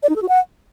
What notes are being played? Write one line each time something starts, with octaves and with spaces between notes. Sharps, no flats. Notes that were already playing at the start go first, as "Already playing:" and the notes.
D5
D#4
A4
F#4
F#5